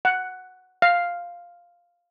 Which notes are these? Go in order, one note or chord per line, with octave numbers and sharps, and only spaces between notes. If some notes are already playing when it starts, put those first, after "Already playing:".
F#5
F5